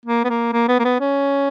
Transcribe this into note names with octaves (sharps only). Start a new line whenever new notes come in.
A#3
B3
A#3
A#3
B3
A#3
B3
C#4